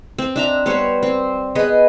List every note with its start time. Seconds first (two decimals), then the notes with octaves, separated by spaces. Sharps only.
0.18 C4
0.36 D4 E5 A#5
0.66 G3 B3 C5 C#5
1.03 C4
1.55 B3 G#4 B4 D#5